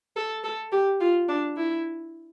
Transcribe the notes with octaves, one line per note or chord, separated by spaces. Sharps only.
A4
A4
G4
F4
D4
E4